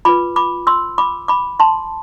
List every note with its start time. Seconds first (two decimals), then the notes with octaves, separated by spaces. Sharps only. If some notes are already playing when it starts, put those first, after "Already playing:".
0.05 F4 B4 B5 D6
0.36 B5 D6
0.67 C6 E6
0.98 B5 D6
1.28 B5 D6
1.60 A5 C6